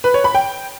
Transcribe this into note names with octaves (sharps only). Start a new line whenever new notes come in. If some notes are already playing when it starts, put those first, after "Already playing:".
B4
C#5
B5
G5